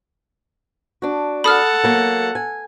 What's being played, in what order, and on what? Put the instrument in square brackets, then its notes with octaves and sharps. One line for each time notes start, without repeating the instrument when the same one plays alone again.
[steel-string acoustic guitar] D4 F#4
[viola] A4 F#5 [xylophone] B5 D#6 F6
[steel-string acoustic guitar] F#3 A#3
G#5